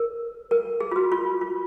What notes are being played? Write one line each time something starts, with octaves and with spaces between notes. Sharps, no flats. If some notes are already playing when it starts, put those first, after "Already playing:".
Already playing: A#4
A#4
G#4
F4
F#4
F4
F4